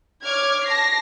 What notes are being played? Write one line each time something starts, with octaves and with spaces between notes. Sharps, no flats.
C#5 D6 F6 G#6
A5 A#6 C7